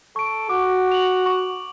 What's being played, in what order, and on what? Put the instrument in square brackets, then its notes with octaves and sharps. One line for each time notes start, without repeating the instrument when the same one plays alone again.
[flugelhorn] A4 [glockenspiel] C#6 D7
[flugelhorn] F#4 [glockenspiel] D6
[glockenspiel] F7 F#7
C#6